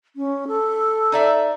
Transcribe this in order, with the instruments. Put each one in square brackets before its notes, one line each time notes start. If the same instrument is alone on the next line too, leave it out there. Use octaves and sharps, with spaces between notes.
[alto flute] C#4
A4
[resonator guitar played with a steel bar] D#4 D5 E5